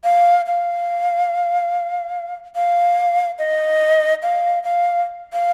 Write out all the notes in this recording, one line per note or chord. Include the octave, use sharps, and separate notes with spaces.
F5
F5
F5
D#5
F5
F5
F5